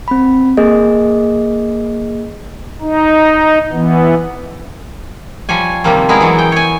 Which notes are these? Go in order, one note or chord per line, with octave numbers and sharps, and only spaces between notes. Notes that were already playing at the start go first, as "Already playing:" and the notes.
C4 B5
A#3 G#4 D#5
D#4
E3 B3
F3 G3 C#5 G#5
C3 D#3 F3 G3 A#3 C4
G#3 B3 E4 G#4 A#4
E3 F#3
G5
C#5 G#5